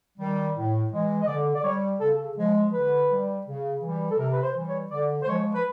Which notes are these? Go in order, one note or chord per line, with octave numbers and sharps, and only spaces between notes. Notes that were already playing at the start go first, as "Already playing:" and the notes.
D#3 G3
A2
E3 G#3
D#5
D3 D5
D5
G3 C#5
C#3 A4
F3 G#3
D3 B4
G3
C#3
E3 G3
A4
C3 A#4
B4
C5
E3 G3
C#5
D3 D5
C5
F3 G#3 C#5
B4